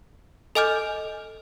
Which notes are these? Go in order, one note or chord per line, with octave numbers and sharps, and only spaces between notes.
A4 D#5 G#5 D6 F6 G6